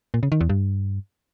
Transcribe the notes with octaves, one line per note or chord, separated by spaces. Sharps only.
A#2
C#3
D#3
E2
G2